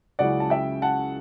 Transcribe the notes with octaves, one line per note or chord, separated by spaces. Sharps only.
C#2 C#3 F#3 C#4 E4 D5 F#5
A5
E5 G5
F#5 A5